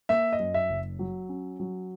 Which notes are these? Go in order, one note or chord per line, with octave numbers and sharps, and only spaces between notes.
A#3 E5
D#5
F#2
E5
F#1
F#3
C#4
F#3